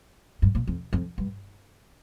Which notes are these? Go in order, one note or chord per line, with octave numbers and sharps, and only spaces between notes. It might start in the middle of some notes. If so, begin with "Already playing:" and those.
G2
A#2
F2
F2
G2